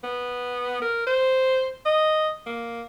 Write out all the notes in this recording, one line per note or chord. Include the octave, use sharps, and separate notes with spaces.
B3
A#4
C5
D#5
A#3